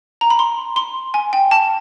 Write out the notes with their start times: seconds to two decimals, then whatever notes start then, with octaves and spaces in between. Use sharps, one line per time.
0.21 A#5
0.30 B5
0.39 C6
0.76 C6
1.14 G#5
1.33 G5
1.51 A5